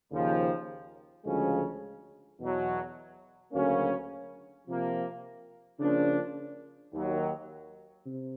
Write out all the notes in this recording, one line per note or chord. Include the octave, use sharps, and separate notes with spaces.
D#2 C#3 F3
D2 C#3 F3 G#3 C#4
E2 B2 F#3
D2 C#3 F#3 A#3 C#4
C3 F3 A#3
C#3 F3 A#3 D4
D#2 D#3 F#3
C3